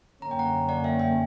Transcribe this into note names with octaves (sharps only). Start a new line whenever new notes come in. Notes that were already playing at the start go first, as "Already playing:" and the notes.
F#2 D3 A#3 C#4 A#5
G5
F#5 A#5
D5 F#5
E5 G5
E5 G5